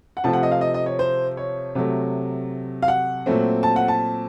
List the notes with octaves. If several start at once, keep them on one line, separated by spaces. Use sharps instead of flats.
F#5
C3 F3 A3 C4 A5
F#5
D#5
F5
D#5
D#5
C#5
C5
C#5
C3 F#3 A3
F5
F#5
A#2 F#3 A3 C4
A5
F#5
A5